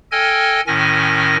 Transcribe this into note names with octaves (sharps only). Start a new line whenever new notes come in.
A4 D#5 G5 G#5 F6 G#6
A2 D#3 C#4 G#5 A#6